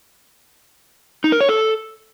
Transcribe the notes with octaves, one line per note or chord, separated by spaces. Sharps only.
D#4
A#4
C#5
A4